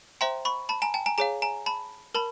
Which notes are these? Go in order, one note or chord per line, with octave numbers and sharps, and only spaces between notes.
C5 E5 G5 A#5 C6
B5 C#6
A5 B5
G#5 A#5
G5 A5
G#5 A#5
G#4 C#5 F5 G#5 A#5
G#5 A#5
A5 B5
A#4 A5 B5